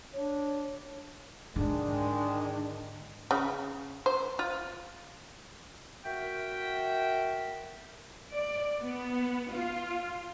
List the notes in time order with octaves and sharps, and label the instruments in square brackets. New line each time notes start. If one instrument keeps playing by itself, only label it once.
[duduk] D4 [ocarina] C#5
[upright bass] G#2 D3 [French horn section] D#3 G#3 [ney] D4
[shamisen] C#3
C5
F4
[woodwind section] F#4 A#4 E5 G5
[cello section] D5
B3
F4